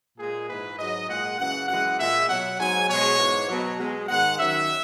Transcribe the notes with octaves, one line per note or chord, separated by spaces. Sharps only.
A#2 G#3 G#4
G#2 E3 G#3 B4
G#2 F#3 D#5
A#2 G#3 F#5
F#2 C#3 E3 F#5
F#2 E3 G#3 F#5
A#2 G#3 E5
B2 F#3 F#5
G#2 F#3 G#5
B2 G#3 C#5
G#2 E3 G#3
B2 F#3
B2 G#3
G#2 D#3 G#3 F#5
F#2 D#3 F#3 E5